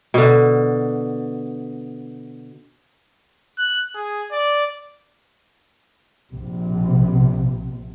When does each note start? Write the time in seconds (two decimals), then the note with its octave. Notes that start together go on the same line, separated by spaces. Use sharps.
0.14 B2 D3
3.58 F#6
3.95 G#4
4.32 D5
6.33 A#1 C3